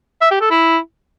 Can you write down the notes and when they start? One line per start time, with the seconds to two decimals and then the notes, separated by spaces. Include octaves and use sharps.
0.22 E5
0.31 G4
0.41 A4
0.51 E4